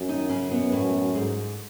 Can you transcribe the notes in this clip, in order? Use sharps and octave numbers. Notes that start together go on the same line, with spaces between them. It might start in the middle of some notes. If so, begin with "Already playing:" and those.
Already playing: F#2
D#3 D#4
C#3 C#4
B2 B3
A2 A3
G#2 G#3